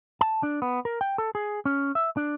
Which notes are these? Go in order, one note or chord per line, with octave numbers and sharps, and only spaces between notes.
A5
D4
B3
A#4
G5
A4
G#4
C#4
E5
D4